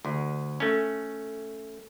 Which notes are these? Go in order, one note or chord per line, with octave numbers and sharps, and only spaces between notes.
D2
A3 C#4